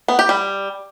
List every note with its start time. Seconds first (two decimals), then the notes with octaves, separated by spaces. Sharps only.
0.08 B3
0.19 G4
0.29 G3